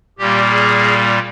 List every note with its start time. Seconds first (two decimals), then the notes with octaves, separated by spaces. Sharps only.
0.19 A#2 G3 A#3 G4
0.51 G#4